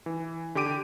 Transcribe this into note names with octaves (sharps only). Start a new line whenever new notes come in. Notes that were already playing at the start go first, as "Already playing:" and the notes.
E3
D3 G4 G5 D6 D7 D#7